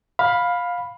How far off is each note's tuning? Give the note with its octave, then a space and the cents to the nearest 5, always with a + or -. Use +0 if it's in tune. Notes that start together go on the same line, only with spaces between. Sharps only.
F5 +15 B5 +0